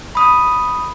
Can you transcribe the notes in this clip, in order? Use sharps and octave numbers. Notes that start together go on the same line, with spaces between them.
B5 D#6